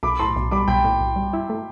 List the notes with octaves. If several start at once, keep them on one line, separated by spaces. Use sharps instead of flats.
B1 B5 D6
A2 A5 C6
B1
G3 B5 D6
B1 G5 B5
A2
B1
G3
E4
A3